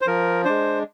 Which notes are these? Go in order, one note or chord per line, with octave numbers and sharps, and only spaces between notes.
C5
F3 A#4
G#3 D4 C5